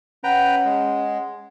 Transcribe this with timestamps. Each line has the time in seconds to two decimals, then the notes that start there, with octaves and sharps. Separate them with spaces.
0.24 C#4 B4 F#5 G5 A#5
0.65 G#3